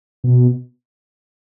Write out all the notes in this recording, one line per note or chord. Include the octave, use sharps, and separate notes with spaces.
B2